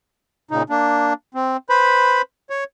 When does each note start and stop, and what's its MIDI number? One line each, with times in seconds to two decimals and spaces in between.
0.51 0.63 46
0.51 0.63 49
0.51 0.63 63
0.70 1.13 58
0.70 1.13 62
1.34 1.57 60
1.70 2.22 71
1.70 2.22 72
1.70 2.22 83
2.50 2.64 73